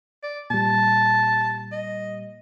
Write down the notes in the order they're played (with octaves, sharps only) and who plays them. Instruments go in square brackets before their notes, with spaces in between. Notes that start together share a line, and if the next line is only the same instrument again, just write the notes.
[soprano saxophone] D5
[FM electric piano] A#2 G3 [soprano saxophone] A5
[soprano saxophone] D#5